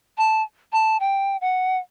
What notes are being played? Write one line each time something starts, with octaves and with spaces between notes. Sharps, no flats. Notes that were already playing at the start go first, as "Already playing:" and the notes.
A5
A5
G5
F#5